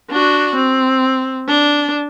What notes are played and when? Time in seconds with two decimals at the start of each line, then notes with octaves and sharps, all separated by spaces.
0.11 D4 F#4
0.56 C4
1.48 D4